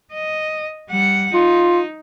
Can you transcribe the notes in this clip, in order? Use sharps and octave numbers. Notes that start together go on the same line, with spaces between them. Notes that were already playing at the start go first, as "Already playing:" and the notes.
D#5
G3 F#5
D#4 F4